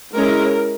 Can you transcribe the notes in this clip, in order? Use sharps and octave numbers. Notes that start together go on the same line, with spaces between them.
G#3 C#4 E4 A#4